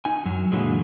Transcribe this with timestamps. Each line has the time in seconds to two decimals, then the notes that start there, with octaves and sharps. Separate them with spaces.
0.05 D#4 G#5
0.25 F#2 F#3
0.52 A#2 D3 E3 F#3 G#3